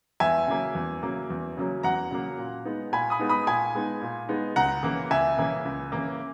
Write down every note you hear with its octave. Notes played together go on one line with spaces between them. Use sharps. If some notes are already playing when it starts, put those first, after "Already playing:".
E2 E5 G#5
C#3 F#3 A#3
E2
C#3 F#3 A#3
E2
C#3 F#3 A#3
E2 F#5 A#5
C#3 F#3 A#3
A#2
G#3 B3 D#4
A#2 G#5 B5
B5 D#6
G#3 B3 D#4
B5 D#6
A#2 G#5 B5
G#3 B3 D#4
A#2
G#3 B3 D#4
C#2 F#5 A#5
C#3 E3 A#3
C#2 E5 G#5
C#3 E3 A#3
C#2
C#3 E3 A#3